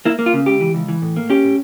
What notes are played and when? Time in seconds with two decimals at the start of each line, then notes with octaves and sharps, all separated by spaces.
0.05 A#3 E4
0.19 A#3
0.26 F4
0.33 C#3
0.46 C#2 G4
0.61 E3
0.75 C#2
0.88 E3
1.02 A2
1.17 A#3
1.30 C#4 G4
1.44 A2